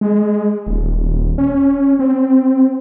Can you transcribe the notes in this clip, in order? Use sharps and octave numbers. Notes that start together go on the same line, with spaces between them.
G#3
D#1
C#4
C4